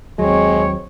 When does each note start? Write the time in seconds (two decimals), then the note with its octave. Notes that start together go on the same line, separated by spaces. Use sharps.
0.19 D#2 F#3 G#3 C4 C#5